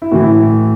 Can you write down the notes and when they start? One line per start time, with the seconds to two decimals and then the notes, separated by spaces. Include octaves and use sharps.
0.02 E4
0.11 A2 E3 F#4
0.24 E4